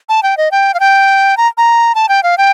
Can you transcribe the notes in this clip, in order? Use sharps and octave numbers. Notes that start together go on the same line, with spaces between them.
A5
G5
D#5
G5
F5
G5
A#5
A#5
A5
G5
F5
G5